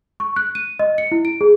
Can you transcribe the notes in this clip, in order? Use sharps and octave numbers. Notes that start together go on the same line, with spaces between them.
C#6
F#6
D#7
D#5
C#7
E4
D7
G#4